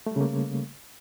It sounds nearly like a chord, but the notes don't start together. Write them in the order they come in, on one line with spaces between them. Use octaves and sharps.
A3 G3 C#3 A#3